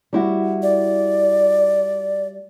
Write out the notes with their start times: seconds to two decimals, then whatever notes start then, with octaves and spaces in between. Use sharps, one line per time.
0.13 G3 E4 F#4
0.63 D5